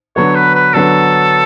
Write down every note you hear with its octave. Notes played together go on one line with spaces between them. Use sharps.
D3 F#3 B3 C#5
B4
B4
D3 F#3 B3 A4